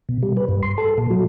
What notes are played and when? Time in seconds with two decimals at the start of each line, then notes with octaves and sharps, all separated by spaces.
0.09 B2
0.23 G3
0.37 B4
0.49 G2
0.63 C6
0.78 A4
0.98 A#2
1.10 F#3